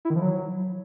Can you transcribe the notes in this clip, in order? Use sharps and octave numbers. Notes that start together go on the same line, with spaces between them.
E4
D#3
F3
F#3